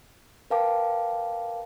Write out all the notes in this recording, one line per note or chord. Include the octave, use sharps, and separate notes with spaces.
A#4 B4 F5 G5 A5 D6